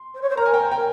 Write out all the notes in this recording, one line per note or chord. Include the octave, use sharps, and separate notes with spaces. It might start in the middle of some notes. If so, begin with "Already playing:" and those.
Already playing: C6
C5
C#5
C5
A#4 A#5
G#5
G5 A#5
C5
A#4 G5 A#5